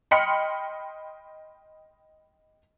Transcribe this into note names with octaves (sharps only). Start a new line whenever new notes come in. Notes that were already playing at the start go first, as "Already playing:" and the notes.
D#5 G5 B5 C6 F6 C#7